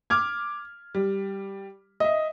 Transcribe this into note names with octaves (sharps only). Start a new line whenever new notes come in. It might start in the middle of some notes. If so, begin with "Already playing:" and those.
D6 F6 G#6
G3
D#5 E5